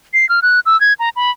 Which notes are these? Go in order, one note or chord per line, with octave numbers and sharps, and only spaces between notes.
C7
F6
F#6
E6
G#6
A#5
B5